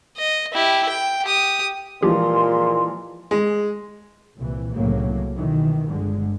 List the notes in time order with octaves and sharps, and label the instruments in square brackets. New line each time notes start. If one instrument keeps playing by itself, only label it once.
[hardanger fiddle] D#5
E4 G4
G5
G4 D#6
[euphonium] A#2 [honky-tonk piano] E3 F3 G#3 [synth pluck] G4 [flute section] C6
[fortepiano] G#3
[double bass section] C2 A#2 E3
C2 A2 C#3 F#3 A#3
B2 D#3 E3
G1 D3 G#3